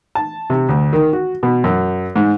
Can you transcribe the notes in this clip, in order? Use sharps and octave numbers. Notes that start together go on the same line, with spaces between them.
A5
C3
D2
D#3
F#4
B2
F#2
G#2